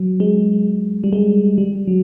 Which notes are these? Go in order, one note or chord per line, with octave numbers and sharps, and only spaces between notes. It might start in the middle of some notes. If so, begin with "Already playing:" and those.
Already playing: F#3
G#3
G3
G#3
G3
F#3